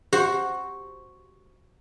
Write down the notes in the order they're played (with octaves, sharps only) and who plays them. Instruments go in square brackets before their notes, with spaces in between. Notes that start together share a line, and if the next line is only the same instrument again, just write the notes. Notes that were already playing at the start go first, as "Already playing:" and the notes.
[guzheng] F#4 C5 [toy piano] G4